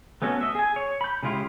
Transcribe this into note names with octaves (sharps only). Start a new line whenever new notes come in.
A3 B3 C#4 F#4 A4
D#5 E5
G#4 G#5
C#5
B5 G6
C#3 G#3 E4 F4 G4